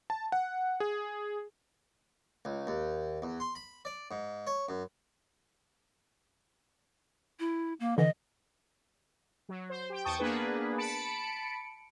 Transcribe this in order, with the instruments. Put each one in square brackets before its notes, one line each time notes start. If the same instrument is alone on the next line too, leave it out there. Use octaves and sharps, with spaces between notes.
[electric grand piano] A5
F#5
G#4
[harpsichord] C#2
D#2
E2
C6
B5
D5
G#2
C#5
F#2
[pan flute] E4
A#3
[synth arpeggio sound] D3 E3 [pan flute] D#5
[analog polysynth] F#3
C5
G4 G5
E2 G5 A5 C#6 D#6
A#3 B3 D4 G#4 B4
A5 B5 C#7 D7